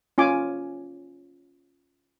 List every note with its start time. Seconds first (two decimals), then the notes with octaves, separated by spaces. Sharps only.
0.18 C#4 F4 G#5 D6